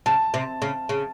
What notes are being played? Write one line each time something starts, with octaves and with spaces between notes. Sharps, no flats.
C#3 A5
C3
C#3
C#3